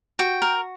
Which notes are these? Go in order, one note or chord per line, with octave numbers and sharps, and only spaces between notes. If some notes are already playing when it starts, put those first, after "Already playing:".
F#4 G5
A#4